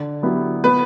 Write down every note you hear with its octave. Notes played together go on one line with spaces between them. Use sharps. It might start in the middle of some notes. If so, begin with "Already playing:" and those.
Already playing: D3
F#3 B3 E4 G4
B3 B4